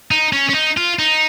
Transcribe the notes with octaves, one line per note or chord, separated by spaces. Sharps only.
D#4
C#4
C#4
D#4
F4
D#4